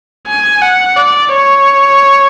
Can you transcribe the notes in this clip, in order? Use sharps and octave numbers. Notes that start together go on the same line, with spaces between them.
G#5
F#5
D5
C#5